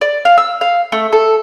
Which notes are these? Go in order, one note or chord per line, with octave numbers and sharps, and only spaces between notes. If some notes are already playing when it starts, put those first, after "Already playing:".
D5
F5
E6
F5
A3
A4